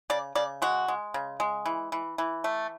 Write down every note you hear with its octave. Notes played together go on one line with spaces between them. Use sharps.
C#3 D5
C#3 D5
G#3 F#4
G#3
C#3
G#3
E3
E3
E3
A3